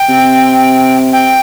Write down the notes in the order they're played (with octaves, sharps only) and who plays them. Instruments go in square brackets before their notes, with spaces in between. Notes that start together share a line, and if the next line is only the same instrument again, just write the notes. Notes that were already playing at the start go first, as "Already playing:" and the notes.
Already playing: [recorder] G5
[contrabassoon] C3
[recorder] G5